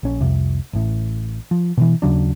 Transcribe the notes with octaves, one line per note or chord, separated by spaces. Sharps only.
A#1 C#4
C2 F2 C3
A1 A2
F3
B2 D3 E3
D#2 C#3 F#3 D4